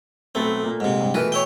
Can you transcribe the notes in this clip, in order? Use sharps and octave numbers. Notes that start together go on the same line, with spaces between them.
B1 A3 B3 C4
A#2 A3 A#3
G#2 C3
G2
B2 E3 A3 A#4 B4
C#5 E5 G5